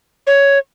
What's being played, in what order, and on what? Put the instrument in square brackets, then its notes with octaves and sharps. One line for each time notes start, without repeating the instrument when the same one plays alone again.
[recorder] C#5